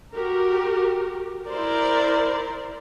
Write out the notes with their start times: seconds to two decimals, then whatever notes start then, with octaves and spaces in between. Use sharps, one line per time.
0.14 F#4 G4 A#4
1.50 E4 A#4 C5 D5